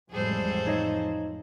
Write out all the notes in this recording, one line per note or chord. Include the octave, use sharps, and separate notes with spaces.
A1 F2 A2 G3 G#3 G#4 A4 C5
D#4 C#5 D#5